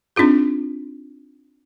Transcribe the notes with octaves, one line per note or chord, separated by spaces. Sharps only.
C4 D4 D#4 F4 G#4